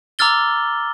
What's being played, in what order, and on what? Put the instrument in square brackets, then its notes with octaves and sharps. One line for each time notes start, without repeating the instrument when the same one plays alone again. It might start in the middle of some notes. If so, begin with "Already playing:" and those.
[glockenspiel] A#5 D6 E6 F6 A6 G7